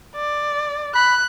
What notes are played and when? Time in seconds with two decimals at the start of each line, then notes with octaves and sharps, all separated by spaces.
0.15 D5
0.95 B5 F#6